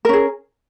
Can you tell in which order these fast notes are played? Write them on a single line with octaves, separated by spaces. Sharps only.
A#4 C#4 G#4